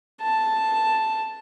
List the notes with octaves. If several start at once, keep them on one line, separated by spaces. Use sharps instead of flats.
A5